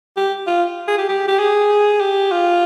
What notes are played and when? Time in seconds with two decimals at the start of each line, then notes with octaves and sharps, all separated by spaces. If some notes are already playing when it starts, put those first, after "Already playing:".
0.17 G4
0.47 F4
0.88 G#4
0.98 G4
1.09 G4
1.28 G4
1.39 G#4
2.00 G4
2.32 F4